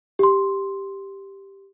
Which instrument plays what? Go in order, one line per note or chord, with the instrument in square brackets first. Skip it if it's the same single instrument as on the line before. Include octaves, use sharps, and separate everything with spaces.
[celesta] G4 C6